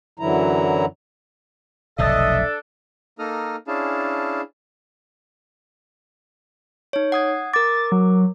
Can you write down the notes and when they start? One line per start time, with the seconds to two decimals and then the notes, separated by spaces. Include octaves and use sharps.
0.19 F#2 D3 E3 F#3 E4 A#5
1.99 F1 B1 D3 D4 A4 D#5 E5
3.19 A#3 D#4 A4 A#5 D#6 F6
3.68 C#4 D4 E4 G#4 F5 A5
6.93 D#4 C#5
7.12 F#5 D#6 G#6
7.53 A#4 D6 A6
7.92 F#3